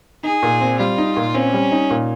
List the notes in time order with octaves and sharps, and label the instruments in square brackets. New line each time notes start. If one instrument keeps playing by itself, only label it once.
[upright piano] D#4 [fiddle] G#4
[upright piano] A#2
C4
[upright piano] G3 [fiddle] F4
[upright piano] D#4
A#2
[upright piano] C4 [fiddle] C#4
[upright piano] G3
D#4
A#2